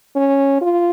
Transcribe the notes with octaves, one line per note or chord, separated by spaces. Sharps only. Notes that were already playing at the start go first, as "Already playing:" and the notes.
C#4
F4